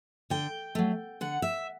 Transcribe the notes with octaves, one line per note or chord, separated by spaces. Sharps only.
D3 G5
F#3 A3
D3 F#5
E5